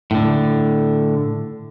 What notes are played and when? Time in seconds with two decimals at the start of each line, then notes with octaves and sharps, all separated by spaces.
0.11 A2 D3